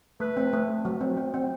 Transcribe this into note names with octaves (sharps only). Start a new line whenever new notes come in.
A3 B4
C4
A3
A3
F#3
C4
C4
C4